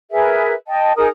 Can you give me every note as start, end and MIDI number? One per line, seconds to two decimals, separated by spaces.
0.11 0.53 68
0.11 0.53 70
0.11 0.53 71
0.11 0.53 76
0.67 0.93 75
0.67 0.93 79
0.67 0.93 81
0.97 1.07 63
0.97 1.07 68
0.97 1.07 70
0.97 1.07 87